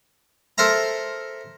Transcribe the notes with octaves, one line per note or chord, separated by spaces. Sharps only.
A4 A#4 C5 E5 A#5